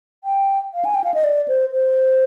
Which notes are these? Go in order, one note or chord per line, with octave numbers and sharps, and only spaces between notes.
G5
F5
G#5
G5
F5
D#5
D5
C5
C5